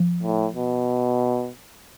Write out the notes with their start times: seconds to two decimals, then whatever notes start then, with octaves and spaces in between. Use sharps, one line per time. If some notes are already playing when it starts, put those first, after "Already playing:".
Already playing: F3
0.23 A2
0.56 B2